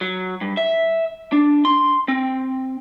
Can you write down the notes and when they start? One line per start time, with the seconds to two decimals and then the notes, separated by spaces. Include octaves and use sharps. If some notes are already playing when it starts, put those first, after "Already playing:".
0.01 F#3
0.41 G2
0.57 E5
1.32 D4
1.65 C6
2.08 C4